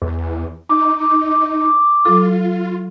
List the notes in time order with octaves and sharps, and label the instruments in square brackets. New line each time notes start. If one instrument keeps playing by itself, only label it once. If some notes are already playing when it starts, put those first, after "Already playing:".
[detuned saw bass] E2
[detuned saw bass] D#4 [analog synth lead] D6
[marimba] F#3 A4 [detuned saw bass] F4